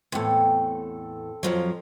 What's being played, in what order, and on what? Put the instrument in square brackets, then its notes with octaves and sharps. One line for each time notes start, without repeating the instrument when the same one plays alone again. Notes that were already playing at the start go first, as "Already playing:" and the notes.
[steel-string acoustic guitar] E2 A2 [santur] C4 A4
[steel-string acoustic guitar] F2 F3 F#3